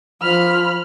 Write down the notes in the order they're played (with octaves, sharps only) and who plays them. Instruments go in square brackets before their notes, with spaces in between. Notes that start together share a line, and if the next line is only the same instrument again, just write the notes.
[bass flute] F3 [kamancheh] B5 F6